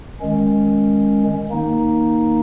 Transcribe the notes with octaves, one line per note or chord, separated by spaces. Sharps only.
D#3 G#3 C#4
D#3 A#3 D#4